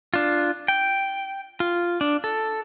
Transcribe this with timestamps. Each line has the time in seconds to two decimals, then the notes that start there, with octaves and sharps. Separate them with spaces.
0.14 D4 F4
0.68 G5
1.60 F4
2.01 D4
2.24 A4